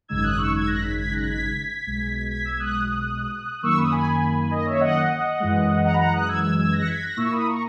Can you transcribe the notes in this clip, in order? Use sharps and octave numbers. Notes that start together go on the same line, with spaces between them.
G#1 F#2 C#3 G#3 D#4 E6 G#6
D#6 F#6
C#6 E6
E6 G#6
F#6 A#6
G#6 B6
G#6 B6
F#6 A#6
G#6 B6
B1 B2 G#3
G#6 B6
E6 G#6
D#6 F#6
F#2 D#3 A#3 C#6 E6
B5 D#6
G#5 B5
D#5
C#5 E5
D#5 F#5
F#2 E3 G#3
F#5 A#5
B5
F#5 A#5
D#6 F#6
E6 G#6
E6 G#6
E6 G#6
F#6 A#6
C#7
G#6 B6
F#6 A#6
A#2 A#3 E4 C#6 E6
B5 D#6
A#5 C#6